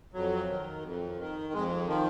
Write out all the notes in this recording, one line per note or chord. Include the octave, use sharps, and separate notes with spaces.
F2 F#3
D#3
F2
D#3
F2 G#3
D#3 F3